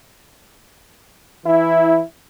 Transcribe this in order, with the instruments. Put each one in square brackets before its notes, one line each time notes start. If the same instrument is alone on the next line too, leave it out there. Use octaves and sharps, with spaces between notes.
[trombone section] E3 E4